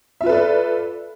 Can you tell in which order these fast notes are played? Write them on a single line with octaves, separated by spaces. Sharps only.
E5 F4 B4 A4 D5